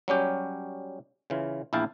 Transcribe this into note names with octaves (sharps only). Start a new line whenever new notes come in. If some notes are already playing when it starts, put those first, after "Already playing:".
F#3 G3 C#4 G4
C#3 E3 F4
A#1 E2 E4 F5 G5 A5